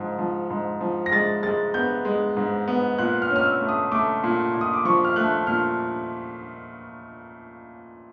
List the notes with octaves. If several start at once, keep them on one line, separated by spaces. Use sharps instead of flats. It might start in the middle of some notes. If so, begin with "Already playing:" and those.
Already playing: G#2 F3
F3
G#2
F3
A#6
G#3 A6
G#3 A6
B3 G6
G#3
G#2
B3
A#2 F#6
F6
C#4
F6
E6
A3
D#6
A3 D6
A#2
A#2
D#6
D6
F3 C#6
F6
A3 F#6
A#2 F6